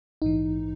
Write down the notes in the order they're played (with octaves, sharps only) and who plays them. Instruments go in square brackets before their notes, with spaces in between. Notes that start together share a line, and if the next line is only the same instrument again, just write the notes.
[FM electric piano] A#1 G#2 E3 D#4